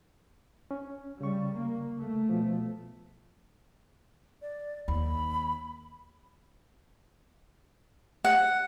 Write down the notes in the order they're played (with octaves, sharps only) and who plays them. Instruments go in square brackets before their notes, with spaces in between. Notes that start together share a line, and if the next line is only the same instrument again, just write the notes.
[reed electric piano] C#4
[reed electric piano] C#3 C#6 [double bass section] G3
[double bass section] A#3
A3
[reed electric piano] B2 F3
[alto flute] D5
[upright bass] D#2 [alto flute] B5
[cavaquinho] F#5